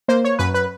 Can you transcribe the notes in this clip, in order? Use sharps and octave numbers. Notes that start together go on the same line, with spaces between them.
A#3 C5
C#5
F#2 B4
B4